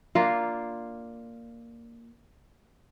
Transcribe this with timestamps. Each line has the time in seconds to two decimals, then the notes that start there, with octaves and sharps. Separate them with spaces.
0.15 A#3 D4 F4